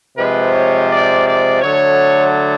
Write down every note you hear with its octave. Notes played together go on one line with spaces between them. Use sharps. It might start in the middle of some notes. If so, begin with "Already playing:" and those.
C3 F3 G#3 B4
C#5
D5
D5
D3 F#3 A3 C#5